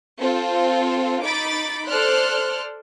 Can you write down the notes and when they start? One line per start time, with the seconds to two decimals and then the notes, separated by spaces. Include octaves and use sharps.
0.19 C4 F4 A4
1.24 D#4 B5 D6 A6 D7
1.87 A4 C5 D5 C6 F6 F#6